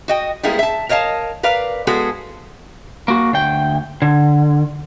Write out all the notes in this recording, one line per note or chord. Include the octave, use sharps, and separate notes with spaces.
F#4 D#5 G5
G3 G#3 A#3 B3 E4 G#4
E5 A5
A#4 C#5 D#5 F5 A5
A#4 B4 D5 F5
G#3 B3 F#4 G#4 A4
A#3 F#4
D2 G5
D3